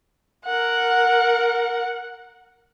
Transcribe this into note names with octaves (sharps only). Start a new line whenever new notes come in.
A#4 F#5